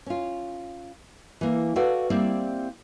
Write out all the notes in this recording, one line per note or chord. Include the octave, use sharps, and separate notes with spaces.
C#4 F4
E3 A#3
F#4 A4 B4 D5 F5 F#5
G3 A#3 C4 E4 D5